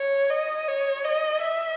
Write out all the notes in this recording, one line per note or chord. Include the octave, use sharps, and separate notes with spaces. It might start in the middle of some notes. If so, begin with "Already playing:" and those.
Already playing: C#5
D#5
C#5
D#5
E5